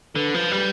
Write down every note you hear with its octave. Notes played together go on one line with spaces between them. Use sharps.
D3 B4
F3
G3